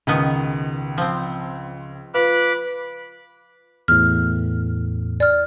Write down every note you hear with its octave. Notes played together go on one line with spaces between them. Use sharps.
C#2 B2 D#3 B3
F3 C4
F4 B4 B5 D6 F#6
E2 A2 F6
D5 F6